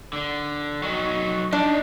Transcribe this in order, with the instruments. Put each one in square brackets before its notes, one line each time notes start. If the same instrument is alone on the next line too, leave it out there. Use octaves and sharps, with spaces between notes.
[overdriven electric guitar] D3
F#3 D#4
[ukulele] D4 [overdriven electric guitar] D#4 D5